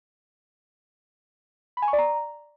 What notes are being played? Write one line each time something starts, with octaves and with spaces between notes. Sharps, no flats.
B5
G#5
C#6
D5
A#5